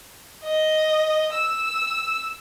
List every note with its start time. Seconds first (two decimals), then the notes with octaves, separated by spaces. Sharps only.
0.44 D#5
1.34 E6